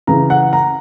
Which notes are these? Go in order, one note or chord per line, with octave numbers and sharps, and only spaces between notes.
C#3 E3 A#5
F#5
A#5